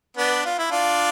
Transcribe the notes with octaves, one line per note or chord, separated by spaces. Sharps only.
B3 D4
F4
E4
D4 F4